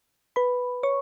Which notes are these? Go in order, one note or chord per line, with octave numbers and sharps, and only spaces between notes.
B4 B5
C#5 C#6